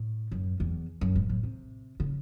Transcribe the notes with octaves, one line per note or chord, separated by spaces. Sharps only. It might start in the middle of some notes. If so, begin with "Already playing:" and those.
Already playing: A2
F#2
E2
F#2
G#2
A2
C3
C#3